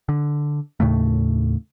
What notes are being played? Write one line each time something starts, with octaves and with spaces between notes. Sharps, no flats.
D3
D#2 A2 C#3 A3